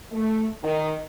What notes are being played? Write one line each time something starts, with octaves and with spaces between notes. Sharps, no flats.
A3
D#3